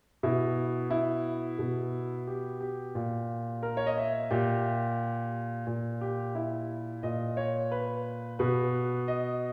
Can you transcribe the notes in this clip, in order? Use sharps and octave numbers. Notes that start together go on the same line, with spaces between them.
B2 E4
E4
B2
G4
G4
A#2
A#4
C#5
D#5
E5
A#2 G4
A#2
G4
E4
A#2 D#5
C#5
B4
B2 B4
D#5